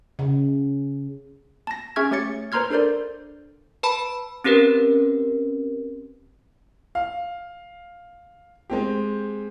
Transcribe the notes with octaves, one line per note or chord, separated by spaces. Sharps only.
C#3
A5 A#6
C#4 G#4 E5 C#6 F6 G#6
A3 G4 C#5 A6 C#7
B4 C5 A#5 C6 F6 G#6
D4 A4 A#4 C5 D5
B4 A5 B5
C4 C#4 G4 A#4 B4
F5
G#3 C4 G4